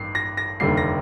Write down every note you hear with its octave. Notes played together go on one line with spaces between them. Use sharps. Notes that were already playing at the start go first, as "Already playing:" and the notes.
Already playing: A1 G2 D#3 A#3 C7
A#6
A#6
F1 D#2 D3 G3 C7
A#6